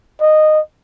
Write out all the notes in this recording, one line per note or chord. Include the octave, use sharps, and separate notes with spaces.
D#5